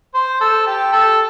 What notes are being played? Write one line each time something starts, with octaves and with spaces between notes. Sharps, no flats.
C5
A4
G4
A4